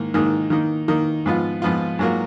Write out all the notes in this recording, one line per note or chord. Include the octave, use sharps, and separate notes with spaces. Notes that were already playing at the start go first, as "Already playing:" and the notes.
Already playing: G#2 D#3 A#3 D#4
G#2 D#3 A#3 D#4
D#3 A#3 D#4
D#3 A#3 D#4
G#2 F3 B3 F4
G#2 F3 B3 F4
G#2 F#3 A#3 F4